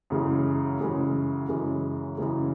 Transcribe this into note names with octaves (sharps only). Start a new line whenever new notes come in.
F#2 C#3 E3 G#3
F#2 C#3 E3 G#3
F#2 C#3 E3 G#3
F#2 C#3 E3 G#3